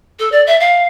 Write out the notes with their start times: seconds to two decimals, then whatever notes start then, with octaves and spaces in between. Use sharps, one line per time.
0.19 A4
0.32 D5
0.47 E5
0.60 F5